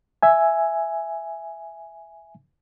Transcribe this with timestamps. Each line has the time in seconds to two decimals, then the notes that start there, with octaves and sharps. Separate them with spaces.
0.23 E5 G#5